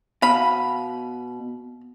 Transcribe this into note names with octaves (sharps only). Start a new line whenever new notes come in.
B2 F5 B5